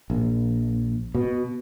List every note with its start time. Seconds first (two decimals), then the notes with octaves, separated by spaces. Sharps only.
0.10 A#1
1.15 B2